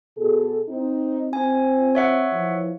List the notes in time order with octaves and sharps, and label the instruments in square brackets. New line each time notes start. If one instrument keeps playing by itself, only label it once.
[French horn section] B2 G#4 A4
C4 D#4
[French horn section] C4 F4 [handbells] G#5
[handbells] C#5 E5 F#5
[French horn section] E3 F3 F4